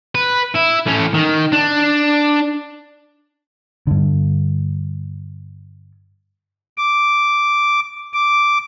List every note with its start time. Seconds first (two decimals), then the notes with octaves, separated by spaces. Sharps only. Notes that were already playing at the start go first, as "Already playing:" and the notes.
0.15 B4
0.54 E4
0.86 A2 C#4
1.14 D#3
1.53 D4
3.87 G2 D3
6.78 D6
8.13 D6